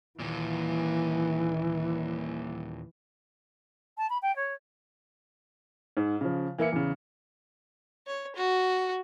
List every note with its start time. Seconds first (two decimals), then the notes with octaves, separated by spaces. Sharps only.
0.20 D#2 A#2 E3
3.97 A5
4.10 B5
4.22 G5
4.36 C#5
5.97 G#2
6.21 C#3 F3
6.58 E3 A#3 E4 C#7
6.73 E2 C#3
8.07 C#5
8.36 F#4